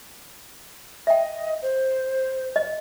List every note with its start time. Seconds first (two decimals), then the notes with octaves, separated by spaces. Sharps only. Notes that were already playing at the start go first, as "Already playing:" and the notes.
1.07 D#5 E5 G5
1.62 C5
2.56 D#5